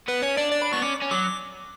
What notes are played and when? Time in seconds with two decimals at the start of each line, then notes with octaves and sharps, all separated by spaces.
0.08 B3 B4
0.23 C#4 C#5
0.37 D4 D5
0.52 D5
0.62 B5
0.73 B3 C#6
0.82 C#4 D6
1.02 C#4
1.11 F#3 D6